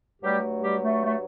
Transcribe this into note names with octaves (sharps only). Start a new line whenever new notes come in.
G2 F#3 G3 A3 G4
G3 G4
A3
A3